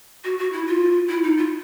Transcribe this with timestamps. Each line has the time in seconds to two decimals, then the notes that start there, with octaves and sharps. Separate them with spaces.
0.25 F#4
0.38 F#4
0.53 E4
0.67 F4
1.09 E4
1.23 D#4
1.37 F4